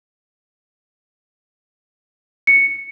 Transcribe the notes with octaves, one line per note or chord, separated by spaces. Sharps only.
C#7